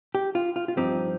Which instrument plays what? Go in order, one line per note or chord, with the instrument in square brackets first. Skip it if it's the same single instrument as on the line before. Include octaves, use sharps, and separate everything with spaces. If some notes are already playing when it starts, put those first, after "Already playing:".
[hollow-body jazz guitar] G4
F4
F4
F4
G2 F3 C4 D#4 G4